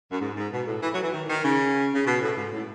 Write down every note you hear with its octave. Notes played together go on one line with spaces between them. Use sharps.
F#2
G#2
G#2
B2
A2
E3
F#3
E3
D#3
D#3
C#3
C#3
B2
A2
G#2
A2